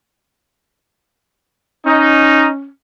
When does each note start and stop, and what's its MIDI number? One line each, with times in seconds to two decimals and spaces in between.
1.86 2.69 61
1.86 2.47 63